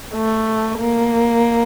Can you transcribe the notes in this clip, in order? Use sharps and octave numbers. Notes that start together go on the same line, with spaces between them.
A3
A#3